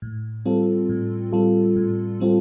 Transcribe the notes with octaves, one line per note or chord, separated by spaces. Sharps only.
A2
G3 C4 F4 A4
A2
G3 C4 F4 A4
A2
G3 C4 F4 A4